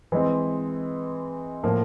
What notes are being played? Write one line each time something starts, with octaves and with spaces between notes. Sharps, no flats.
E3 G#3 C4
A2 F3 A#3